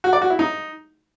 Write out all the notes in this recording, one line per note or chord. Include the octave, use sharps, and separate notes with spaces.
F#4
D5
F#4
E4
D#4